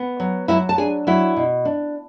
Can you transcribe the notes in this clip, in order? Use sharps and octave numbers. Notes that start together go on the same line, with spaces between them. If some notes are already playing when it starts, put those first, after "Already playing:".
Already playing: B3
F#3
F#3 E4 E5
A5
D4 G#4 G#5
F#3 E4 E5
B2
D4